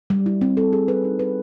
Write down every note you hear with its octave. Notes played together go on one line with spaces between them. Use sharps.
G3
E4
C4
A4
G#4
B4
D#4
B4